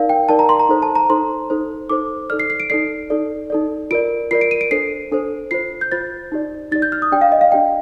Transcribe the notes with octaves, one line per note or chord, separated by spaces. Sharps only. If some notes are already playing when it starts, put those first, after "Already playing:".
Already playing: D#4 A#4 D5 F5
G5
D#4 A#4 D5 A5
A#5
C6
A#5
D#4 A4 C5
A5
A#5
D#4 A4 C5 C6
D#4 A4 C5
D#4 A4 C5 D6
D#4 A4 D5 F6
C7
C7
D7
D#4 A4 D5 C7
D#4 A4 D5
D#4 A4 D5
F4 A#4 D5 D7
F4 A#4 D5 C7
D7
D#7
D7
D4 A4 C5 C7
D4 A4 C5
F4 C5 C7
G6
F4 C5 A6
D#4 G4 D5
D#4 G4 D5 A6
G6
F6
D#6
D4 G4 D5 G5
F5
D#5
F5
D4 G4 D5 G5